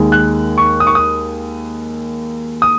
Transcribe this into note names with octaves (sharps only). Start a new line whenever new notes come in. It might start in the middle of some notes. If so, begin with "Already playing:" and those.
Already playing: D#2 D#3 G#3
F#6
C#6
D#6
C#6
D#6
D#6